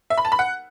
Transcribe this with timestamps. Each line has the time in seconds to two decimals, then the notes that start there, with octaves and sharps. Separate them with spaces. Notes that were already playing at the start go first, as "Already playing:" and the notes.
0.10 E5
0.18 B5
0.25 A5
0.32 B5
0.39 F#5